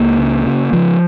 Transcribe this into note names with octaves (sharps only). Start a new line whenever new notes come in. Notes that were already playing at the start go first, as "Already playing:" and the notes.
Already playing: C#2 A#3
C#3
C#3
C#3 F3